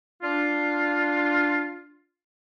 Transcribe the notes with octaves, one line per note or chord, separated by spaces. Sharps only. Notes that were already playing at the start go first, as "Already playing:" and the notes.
D4 F4